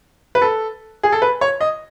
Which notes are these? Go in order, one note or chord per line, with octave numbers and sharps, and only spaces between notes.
B4
A4
G#4
A4
B4
C#5
D#5